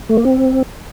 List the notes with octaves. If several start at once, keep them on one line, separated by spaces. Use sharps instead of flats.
A3
A#3
C4